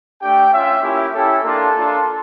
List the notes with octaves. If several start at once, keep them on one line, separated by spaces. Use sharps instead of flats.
A3 D4 G4 G5
C#4 F4 E5
A#3 C#4 E4 G4
C#4 E4 G4 A4
A#3 D4 F4 A4
A#3 D4 F4